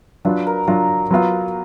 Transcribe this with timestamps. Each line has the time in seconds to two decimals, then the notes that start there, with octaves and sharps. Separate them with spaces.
0.25 F#3 D4 F4 B4
0.47 A#4
0.67 F#3 D4 F4 A#4
1.11 F#3 B3 F4